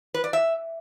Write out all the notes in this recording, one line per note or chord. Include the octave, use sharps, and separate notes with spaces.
B4
D5
E5